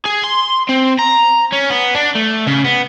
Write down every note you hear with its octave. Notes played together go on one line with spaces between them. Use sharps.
G#4
C6
C4
A#5
C#4
B3
D4
A3
C#3
B3